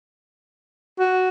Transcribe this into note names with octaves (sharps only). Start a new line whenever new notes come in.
F#4